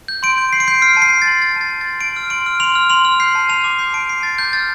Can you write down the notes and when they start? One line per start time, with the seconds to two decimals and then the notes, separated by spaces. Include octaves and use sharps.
0.08 G6
0.23 C6 D7
0.38 G6
0.53 C6 C7
0.60 D7
0.68 G6 C7
0.82 F6 C7
0.97 A5
1.02 C7
1.13 A5
1.22 A6
1.27 C6
1.42 F6 A6
1.56 A5 A6
1.72 A5
1.81 C6 A6
2.01 C6 D7
2.16 F6
2.30 C6 D7
2.46 F6
2.60 C6 F7
2.75 F6
2.90 C6 F7
3.05 F6
3.20 G6 C7
3.35 A5
3.49 A5 F7
3.64 D6
3.79 G6 C7
3.94 A5 D7
4.10 A5 C7
4.23 D6 A6
4.38 A5 G6
4.53 F6 A6